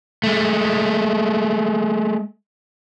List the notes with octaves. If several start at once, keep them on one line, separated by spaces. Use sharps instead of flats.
G#3 A3